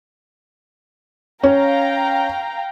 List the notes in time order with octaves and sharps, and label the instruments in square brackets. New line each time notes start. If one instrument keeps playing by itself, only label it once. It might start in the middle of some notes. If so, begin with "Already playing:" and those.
[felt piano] C#4 [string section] F5 G5 A#5